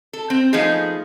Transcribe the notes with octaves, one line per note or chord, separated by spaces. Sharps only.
A4
C4
F3 A3 B3 D#4 G#4